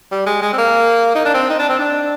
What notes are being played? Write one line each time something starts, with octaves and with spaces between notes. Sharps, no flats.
G3
G#3
G#3
C4
A#3
D#4
D4
C4
D#4
D4
C4
D4